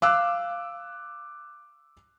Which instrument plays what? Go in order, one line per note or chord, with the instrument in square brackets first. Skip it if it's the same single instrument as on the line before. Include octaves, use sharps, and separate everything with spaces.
[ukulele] F5 [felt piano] D6 E6 F#6